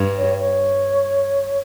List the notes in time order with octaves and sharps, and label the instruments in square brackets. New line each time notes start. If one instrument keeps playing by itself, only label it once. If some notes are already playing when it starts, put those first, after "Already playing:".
Already playing: [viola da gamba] G2
[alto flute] C#5
C#5